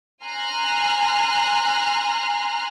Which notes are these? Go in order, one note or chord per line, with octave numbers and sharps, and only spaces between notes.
G#5 A#5 C6 F6 F#6